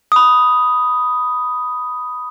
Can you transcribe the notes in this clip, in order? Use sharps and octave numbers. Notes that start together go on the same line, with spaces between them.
B5 D#6